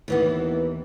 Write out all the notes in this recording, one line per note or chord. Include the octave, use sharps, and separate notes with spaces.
D#2 E3 B3